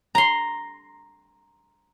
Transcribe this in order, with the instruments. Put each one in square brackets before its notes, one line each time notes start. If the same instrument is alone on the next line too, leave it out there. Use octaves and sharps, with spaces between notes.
[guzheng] A#5 C6